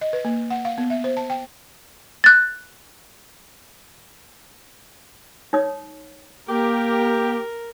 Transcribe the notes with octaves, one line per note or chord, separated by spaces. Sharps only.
D#5
B4
A#3
F#5
F5
B3
E5
C5
A5
G5
F#6 A6
D#4 C#5 D#6
A#3 G4 A#4